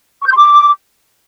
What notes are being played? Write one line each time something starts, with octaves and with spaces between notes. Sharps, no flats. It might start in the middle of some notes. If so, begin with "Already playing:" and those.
C#6
G6
C6
D6